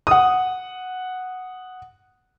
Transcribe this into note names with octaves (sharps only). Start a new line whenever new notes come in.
F#5 D#6